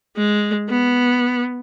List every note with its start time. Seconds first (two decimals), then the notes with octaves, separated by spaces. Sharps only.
0.16 G#3
0.68 B3